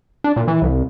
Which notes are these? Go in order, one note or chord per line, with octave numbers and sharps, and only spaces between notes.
D4
A#2
E3
C2